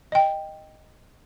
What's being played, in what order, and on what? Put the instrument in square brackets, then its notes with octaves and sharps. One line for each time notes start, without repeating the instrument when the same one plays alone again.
[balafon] D#5 G5